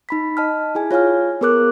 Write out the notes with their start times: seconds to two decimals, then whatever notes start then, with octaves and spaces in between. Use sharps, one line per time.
0.09 D#4 B5 B6
0.37 D#5 A5 F6
0.75 E4 G#4 G#5
0.91 F4 C#5 F5 G#5 F6
1.41 B3 G#4 A#4 D6 F#6